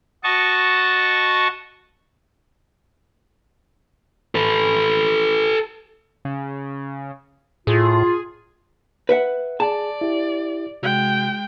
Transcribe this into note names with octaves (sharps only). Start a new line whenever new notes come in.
F#4 D#5 A5 C#6
A4 B4
C#3
A2 F4 G#4
B4 E5 F#5
G#4 D5 A5
E4 G4
C3 G#3 F#4 G5